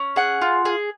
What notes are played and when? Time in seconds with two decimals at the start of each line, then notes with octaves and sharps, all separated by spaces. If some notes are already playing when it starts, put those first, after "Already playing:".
Already playing: C#4
0.16 G#4 F#5
0.41 F4
0.65 G#4